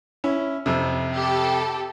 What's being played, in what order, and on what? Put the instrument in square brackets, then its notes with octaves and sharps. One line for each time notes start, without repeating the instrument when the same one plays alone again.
[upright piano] C#4 E4
F2 C3
[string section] G4 A4